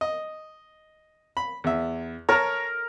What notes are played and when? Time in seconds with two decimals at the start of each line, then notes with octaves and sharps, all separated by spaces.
0.01 D#5
1.37 B5
1.64 E2 E5
2.29 A#4 C#5 A5 A#5